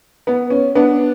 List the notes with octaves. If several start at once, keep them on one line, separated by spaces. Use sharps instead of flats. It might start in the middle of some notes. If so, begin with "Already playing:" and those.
B3
C#4
B3 D4